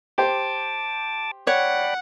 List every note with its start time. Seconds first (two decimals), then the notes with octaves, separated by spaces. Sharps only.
0.18 G4 C5 A5 D6
1.47 C#5 D5 F#5 G5 B5